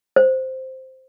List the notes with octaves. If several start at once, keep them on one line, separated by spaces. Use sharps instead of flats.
C5